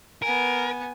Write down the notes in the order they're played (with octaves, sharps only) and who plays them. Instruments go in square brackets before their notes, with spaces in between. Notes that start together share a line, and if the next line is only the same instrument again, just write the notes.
[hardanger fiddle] B3 G#5 [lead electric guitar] A#4